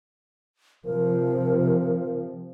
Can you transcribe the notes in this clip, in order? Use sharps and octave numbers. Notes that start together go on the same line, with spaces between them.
C3 F3 A#4